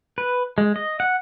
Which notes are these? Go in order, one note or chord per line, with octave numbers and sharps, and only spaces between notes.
B4
G#3
D#5
F#5